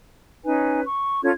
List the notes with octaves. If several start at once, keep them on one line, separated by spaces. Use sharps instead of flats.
C#4 D#4 B4 G#5
C#6
C#4 F4 A4 G#6